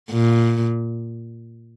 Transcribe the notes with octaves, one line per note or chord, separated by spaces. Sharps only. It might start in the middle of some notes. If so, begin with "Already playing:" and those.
A#2